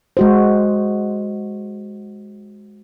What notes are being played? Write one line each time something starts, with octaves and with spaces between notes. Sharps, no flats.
G#3 F#4 C5